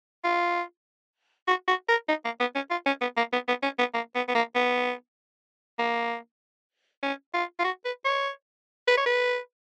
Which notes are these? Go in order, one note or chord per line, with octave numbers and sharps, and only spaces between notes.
F4
F#4
F#4
A#4
D#4
A#3
B3
C#4
F4
C#4
B3
A#3
B3
B3
C#4
B3
A#3
B3
B3
A#3
B3
A#3
C#4
F4
F4
F#4
B4
C#5
B4
C#5
B4